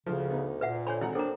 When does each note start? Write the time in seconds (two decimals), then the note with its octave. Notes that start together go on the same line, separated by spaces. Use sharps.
0.06 D2 C#3 F3
0.30 B3 D#4
0.61 A#2 B4 E5 F#5
0.87 D3 C5 C#5 G#5 B5
1.01 G#1 F#5 A#5
1.15 A#3 C4 D4 A4 A#5